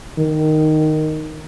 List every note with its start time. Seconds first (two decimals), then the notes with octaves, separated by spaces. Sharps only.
0.18 D#3